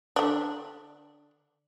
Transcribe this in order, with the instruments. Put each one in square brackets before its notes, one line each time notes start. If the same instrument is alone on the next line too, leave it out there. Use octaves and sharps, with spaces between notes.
[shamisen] D3 D4